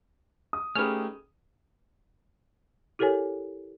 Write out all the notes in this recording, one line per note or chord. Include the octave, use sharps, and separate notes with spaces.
D#6
A3 C#4 D#4 G4 G#4 B4 F6
E4 G4 A4 A#4 C#5 G#5